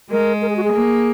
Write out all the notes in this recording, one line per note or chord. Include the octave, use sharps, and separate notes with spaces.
G#3 A#4
A#4
G#4
F#4
G#4
A#3